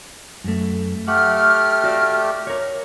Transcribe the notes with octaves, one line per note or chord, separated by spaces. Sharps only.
F#2 A3
A3 G4 F#5 F6
F#4 D5 F5
A#4 C#5